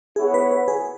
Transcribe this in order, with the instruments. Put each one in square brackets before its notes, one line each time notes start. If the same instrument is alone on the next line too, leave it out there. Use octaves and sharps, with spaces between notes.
[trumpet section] B3 E4 C#5 F#5 [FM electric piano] G#4
[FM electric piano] B4
B4
G#4